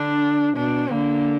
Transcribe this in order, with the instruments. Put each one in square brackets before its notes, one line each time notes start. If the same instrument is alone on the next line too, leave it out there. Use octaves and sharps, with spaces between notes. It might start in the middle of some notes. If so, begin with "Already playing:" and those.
Already playing: [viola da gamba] D3 [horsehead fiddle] D4
[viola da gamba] B2 [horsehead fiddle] D4
[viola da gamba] D3 [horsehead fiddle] A#3